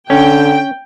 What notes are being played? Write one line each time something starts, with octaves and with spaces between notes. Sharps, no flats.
D3 C#4 G5